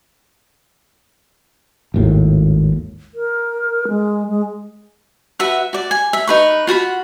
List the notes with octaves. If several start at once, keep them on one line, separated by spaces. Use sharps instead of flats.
G#1 D#2 A2
A#4
G#3
G#3
F#4 B4 E5 F#5
F#4 D5
G#5
E5
D#4 B4 C#6
F4 F#4 F#5 B5